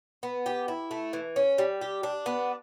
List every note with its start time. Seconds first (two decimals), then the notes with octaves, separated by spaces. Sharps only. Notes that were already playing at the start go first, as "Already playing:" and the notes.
0.23 B3
0.46 G4
0.68 E4
0.91 A3
1.13 E3
1.36 C#4
1.58 G3
1.81 G4
2.03 D4
2.26 B3